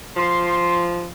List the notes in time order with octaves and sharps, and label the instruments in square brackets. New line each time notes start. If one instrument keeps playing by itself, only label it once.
[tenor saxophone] F3 [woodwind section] C6